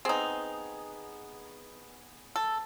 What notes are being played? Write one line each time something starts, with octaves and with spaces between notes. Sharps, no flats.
B3 C4 D#4 G#4
A4